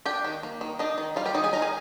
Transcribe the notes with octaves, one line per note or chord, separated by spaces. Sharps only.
D4 G4 G5
D#3
A#3
D#3
D4 D#4 D#5
D#3
G3 F4 F5
G4 G5
D#3 D#4 D#5
G#4 G#5
D#4 A#4 A#5
G#4 G#5